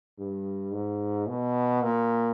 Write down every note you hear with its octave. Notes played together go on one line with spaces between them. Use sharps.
G2
G#2
B2
A#2